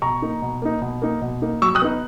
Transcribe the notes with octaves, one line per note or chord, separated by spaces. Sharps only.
B2 A#5 C#6
A#3 D#4
B2
A#3 D#4
B2
A#3 D#4
B2
A#3 D#4
F#3 C#6 E6
D#6 F#6
B3 D#4